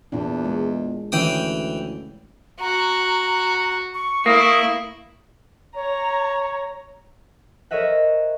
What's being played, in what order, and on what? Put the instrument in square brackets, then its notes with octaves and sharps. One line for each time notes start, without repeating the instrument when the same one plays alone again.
[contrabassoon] E2 [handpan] A#2 D4
[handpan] G#3
[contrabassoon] D2 [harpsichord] E3 G5 D#6 [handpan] C#4
[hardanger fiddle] F#4 [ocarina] A#5
[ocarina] C#6
[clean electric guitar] A#3 [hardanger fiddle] E4 [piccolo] D#6
[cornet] C#5 [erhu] A#5
[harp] A#4 C5 C#5 D#5 E5 F#5